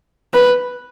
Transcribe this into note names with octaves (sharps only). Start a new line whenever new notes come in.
B4